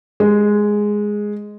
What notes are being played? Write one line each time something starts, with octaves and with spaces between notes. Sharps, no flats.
G#3